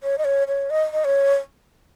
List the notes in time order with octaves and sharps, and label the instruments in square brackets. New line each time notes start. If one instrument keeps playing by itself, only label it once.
[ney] C#5
D#5
C#5
C#5
D#5
D#5
C#5